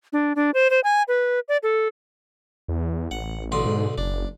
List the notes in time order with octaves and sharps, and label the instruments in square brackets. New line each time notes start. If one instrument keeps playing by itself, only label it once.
[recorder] D4
D4
C5
C5
G#5
B4
D5
A4
[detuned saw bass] E2
[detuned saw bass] A1 [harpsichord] F#5
[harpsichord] B1 D3 C6
[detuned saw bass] G#2
[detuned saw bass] F#1 [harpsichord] D4